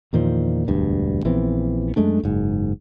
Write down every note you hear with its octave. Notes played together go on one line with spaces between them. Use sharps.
E2 A#2 D#3 F3
E1 D2 G2
A#1 E3 B3 C4
F#2 G#3 A3 D4
F#1 G#2